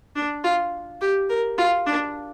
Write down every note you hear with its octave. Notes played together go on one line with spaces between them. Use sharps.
D4
F4
G4
A#4
F4
D4